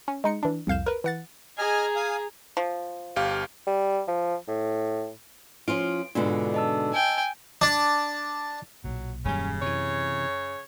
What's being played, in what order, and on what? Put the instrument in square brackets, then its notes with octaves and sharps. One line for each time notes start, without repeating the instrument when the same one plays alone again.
[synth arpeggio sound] C#4
G#3 D#4 C#7
E3 D4
C2 F2 F5 G6 E7
A#4 B4
E3 F#5 A6
[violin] G#4 A#5 [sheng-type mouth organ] D#5 G#5 F6
[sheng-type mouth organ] F5 G#5 D#6
[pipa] F3
[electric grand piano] G1 G4 F5
[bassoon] G3
F3
A2
[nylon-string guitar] F3 C#4 F4 [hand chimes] D7
[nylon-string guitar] G#2 B2 D3 [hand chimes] D4 F4
[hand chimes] D#5 A5 E6
[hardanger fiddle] G5 G#5
[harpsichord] D4
[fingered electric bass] B1 A#2 [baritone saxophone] F#3
[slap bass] D#1 G3 [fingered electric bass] F#2 [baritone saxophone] C#3 [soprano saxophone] C#4
[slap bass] C3 E3 [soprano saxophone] C#5